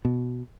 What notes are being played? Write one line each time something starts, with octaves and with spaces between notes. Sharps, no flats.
B2